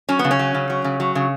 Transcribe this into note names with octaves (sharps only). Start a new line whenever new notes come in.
F#3 C#4
B3
C#3
C#4
F#3
C#3
F#3
C#3
F#3
C#3